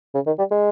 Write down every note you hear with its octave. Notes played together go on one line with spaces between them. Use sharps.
C#3
D#3
G3
G#3